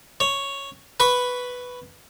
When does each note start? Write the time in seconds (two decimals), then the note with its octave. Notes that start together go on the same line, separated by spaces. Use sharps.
0.20 C#5
1.00 B4 B5 C#6